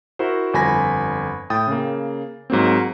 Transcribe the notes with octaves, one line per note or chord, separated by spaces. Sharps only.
E4 F#4 A#4 C5
G1 F2 G#5 B5 A#6
A2 G5 D#6 A6
C#3 A#3
G#2 F#3 A#3 C4